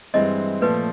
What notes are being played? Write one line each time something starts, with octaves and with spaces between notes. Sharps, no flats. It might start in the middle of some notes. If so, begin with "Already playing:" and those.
G2 E3 G#3 C4 D#5
A#2 F3 A3 B4